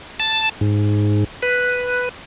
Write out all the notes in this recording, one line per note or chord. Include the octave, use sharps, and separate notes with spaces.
A5
G#2
B4